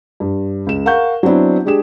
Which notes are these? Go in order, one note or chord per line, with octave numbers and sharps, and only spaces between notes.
G2
C#2 E7
A#4 F5 F#5 C#6 G6
F#3 B3 C4 D4 E4
G#3 D4 G4 G#4 E7